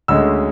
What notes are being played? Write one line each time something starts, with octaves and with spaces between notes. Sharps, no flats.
D2 D3 G#3 C#4 E6